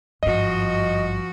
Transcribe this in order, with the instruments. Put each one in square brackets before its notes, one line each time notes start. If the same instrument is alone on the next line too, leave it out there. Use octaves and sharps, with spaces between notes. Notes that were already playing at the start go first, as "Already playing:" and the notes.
[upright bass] G#1 G2 [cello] F3 F#4 [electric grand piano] D#5